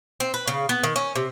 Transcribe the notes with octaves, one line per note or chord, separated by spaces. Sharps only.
C4
B4
C#3
B3
D#3
C#4
C3